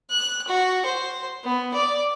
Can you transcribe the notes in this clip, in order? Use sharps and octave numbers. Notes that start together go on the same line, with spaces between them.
F#6
F#4
C5
B3
D5